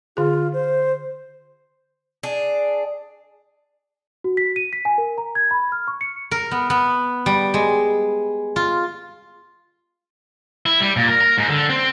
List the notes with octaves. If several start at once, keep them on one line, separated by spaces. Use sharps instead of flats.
D3 F4 G#4
C5
D4 G#4
F#4
B6
D#7
B6
G#5
A#4
A#5
G#6
B5
F6
C#6
C#7
A#4
B3
B3
G3
G#3
F4
E4
G3
A#2
A#4
A#4
G#2
D3
C4